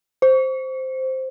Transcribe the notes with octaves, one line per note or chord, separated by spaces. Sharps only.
C5